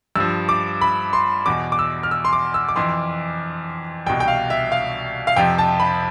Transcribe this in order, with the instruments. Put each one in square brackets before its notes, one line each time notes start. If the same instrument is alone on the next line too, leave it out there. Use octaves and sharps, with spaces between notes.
[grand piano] G2 F3 E6
D6
B5
C6
E2 B2 D6
D6
E6
F6
E6
C6
D6
E6
D6
F2 E3 C6
C2 B2 G5
G5
F5
E5
F5
F5
F2 C3 F3 G5
A5
B5